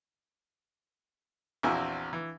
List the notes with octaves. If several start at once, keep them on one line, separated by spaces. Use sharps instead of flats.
A#1 E2 C4 E4 F#4 G#5
E3